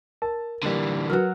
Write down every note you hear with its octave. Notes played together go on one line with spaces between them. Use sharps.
A#4 A5
D3 E3 G3 A#3
F#3 F#4 A#4 B4 F6